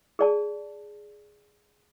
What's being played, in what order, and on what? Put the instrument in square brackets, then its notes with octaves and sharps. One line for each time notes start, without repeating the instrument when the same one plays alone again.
[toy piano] G#4 D5 A5